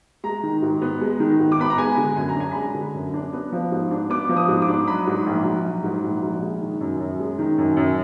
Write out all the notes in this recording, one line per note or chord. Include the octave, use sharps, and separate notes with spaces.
G#3 A#5
D#3
G#2
B3
G#3
D#3
G#2
D6
B3 B5
A#5
G#3 G#5
D3
F#2 G#5
A#5
D4 G#5
B5
G#3 A#5
D3
F#2
D4
B3
F3
G#2
D4
B3 D6
F3
D#6
G#2
D6
D4
F#3 B5
G#2
A#1
A#1
F#3
G#2
A#1
A#1
G#3
D#3
F#2
F#2
G#3
D#3
F#2
F#2